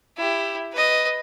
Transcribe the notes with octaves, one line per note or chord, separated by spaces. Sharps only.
E4 G4
B4 D#5